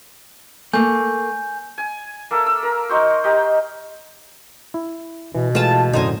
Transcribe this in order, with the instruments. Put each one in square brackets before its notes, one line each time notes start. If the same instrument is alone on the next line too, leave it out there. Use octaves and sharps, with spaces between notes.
[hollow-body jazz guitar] A3 A#3 [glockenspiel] G#5 G6
[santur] G#5
A#3 A4 E5
E6
A#4
D#4 F#4 C5
D#4 G4
[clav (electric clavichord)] E4
[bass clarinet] B2 [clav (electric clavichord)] E3
[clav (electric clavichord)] E3 G#3 A3 [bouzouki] F4 A5
[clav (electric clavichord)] F#2 A2 D3 [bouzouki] D#4 C5 G#5